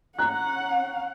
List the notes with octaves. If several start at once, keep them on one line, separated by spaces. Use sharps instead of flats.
C#4 F#5 A#5 F#6